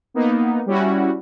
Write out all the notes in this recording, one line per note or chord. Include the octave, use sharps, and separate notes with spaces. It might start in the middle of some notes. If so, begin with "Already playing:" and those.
A#3 B3 D#4
G3 C#4 E4 F#4